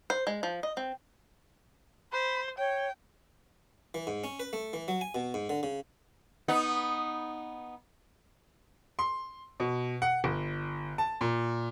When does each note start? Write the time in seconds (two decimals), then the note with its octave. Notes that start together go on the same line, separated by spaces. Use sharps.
0.10 C5
0.27 G#3
0.43 F3
0.63 D#5
0.77 C4
2.12 C5 B5
2.58 C#5 G5
3.94 E3
4.07 G#2
4.24 C#4
4.40 B4
4.53 A3
4.73 E3
4.88 F#3
5.01 G#5
5.15 B2
5.34 G#2
5.49 D3
5.63 C#3
6.48 B3 D#4
8.99 C6
9.60 B2
10.02 F#5
10.24 G1
10.98 A5
11.21 A#2